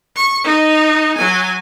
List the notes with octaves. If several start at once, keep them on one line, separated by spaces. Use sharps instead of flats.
C#6
D#4 D#5
F#3 G#5